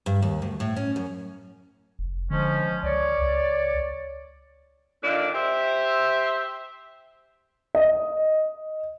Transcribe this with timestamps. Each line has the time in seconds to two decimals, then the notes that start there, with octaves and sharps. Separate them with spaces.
0.06 G2
0.22 D#2
0.42 D2
0.60 A2
0.76 C#4
0.96 F#2
1.99 F1
2.31 D3 F3 G#3 C#4
2.83 C#2 C#5 D5
3.21 C#2
5.04 A#2 D3 D#3 A#3 D4
5.35 G4 C5 E5
7.75 D#5